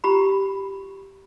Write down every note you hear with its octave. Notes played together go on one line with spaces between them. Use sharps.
F4 G4 A#5 B5